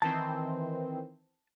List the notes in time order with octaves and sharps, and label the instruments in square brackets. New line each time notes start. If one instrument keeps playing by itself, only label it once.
[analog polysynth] D#3 E3 C4 [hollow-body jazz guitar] A5